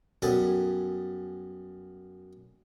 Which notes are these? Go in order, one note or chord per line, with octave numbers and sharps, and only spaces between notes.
F#2 G3 B3 G#4 A4 A5